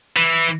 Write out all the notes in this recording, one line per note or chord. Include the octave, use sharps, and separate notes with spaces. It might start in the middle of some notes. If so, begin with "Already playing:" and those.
E3